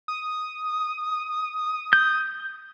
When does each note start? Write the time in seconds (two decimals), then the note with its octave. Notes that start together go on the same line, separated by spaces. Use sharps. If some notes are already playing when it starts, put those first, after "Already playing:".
0.08 D#6
1.93 G6